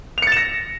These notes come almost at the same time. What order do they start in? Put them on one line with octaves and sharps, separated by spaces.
F7 C#7 A6 E7 A#6